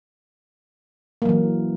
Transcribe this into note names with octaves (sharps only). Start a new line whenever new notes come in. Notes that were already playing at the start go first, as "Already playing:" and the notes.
E3 F#3 A#3